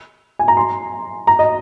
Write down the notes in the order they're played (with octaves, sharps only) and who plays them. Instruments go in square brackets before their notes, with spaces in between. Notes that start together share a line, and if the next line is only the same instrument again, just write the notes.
[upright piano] G#5
A#5
C6
A#5
D#5